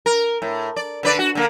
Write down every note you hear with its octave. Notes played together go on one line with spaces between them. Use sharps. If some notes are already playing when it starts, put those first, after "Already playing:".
A#4
A2
D5
D3 B4 D5
F#4
D3 A#3